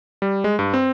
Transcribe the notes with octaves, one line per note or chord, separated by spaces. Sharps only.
G3
G#3
G2
C4